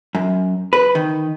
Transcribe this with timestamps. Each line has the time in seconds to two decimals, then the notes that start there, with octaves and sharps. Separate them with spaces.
0.15 F#2
0.73 B4
0.95 D#3